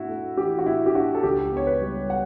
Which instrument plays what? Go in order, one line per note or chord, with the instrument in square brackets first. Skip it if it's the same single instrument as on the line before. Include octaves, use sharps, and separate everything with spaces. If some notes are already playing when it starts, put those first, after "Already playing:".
Already playing: [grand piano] A2 D4 E4 F#4
A3
E3 G4
F#4
A2 E4
G4
D4 F#4
A4
C#2 G4
B3 C#5
B4
G3
F#5